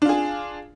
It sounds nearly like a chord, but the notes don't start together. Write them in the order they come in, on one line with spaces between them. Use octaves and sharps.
D4 F4 G#4